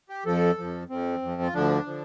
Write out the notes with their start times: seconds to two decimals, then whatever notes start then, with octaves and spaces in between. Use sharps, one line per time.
0.09 G4
0.26 F2 F3 A4
0.58 F2 F3
0.90 F2 F3 C4
1.22 F2 F3
1.42 F4
1.54 D2 D3 F3 D4
1.86 D3 F3